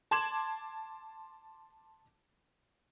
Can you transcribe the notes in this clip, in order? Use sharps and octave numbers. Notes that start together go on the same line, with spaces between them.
A5 C6 D6 G#6 E7 F#7